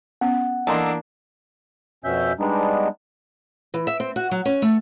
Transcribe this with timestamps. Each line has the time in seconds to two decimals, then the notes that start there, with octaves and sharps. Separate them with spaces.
0.21 B3 C#4 F#5
0.67 E3 A#3 D4 D#4 A4 G#5 C6
2.04 F2 B2 C#4 E5 G6
2.40 G3 G#3 B3 D4 D#4
3.74 E3
3.87 E5
4.00 C4
4.16 F#4
4.31 F#3
4.45 C#4
4.62 A3